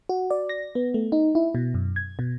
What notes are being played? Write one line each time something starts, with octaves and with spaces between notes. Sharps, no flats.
F#4
D5
A#6
B3
A3
D#4
E4
B2
F#2
G#6
B2